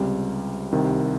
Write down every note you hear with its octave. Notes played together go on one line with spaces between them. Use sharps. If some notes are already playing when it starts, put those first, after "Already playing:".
Already playing: C#2 C3 G3
C2 C3 D#3